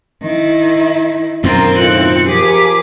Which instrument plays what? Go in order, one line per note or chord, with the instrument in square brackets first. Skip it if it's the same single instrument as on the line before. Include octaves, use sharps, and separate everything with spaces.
[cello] D#3 E4
[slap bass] F#2 B2 D#3 [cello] C4 [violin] F4 A#4
[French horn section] A2 D#4 F4 [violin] F#6 C#7
[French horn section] F3 G4 A#4 [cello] G#4 [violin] D6 B6